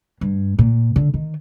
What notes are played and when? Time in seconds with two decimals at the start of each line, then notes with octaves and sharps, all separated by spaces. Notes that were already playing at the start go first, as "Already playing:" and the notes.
0.21 G2
0.59 A#2
0.96 D3
1.14 D#3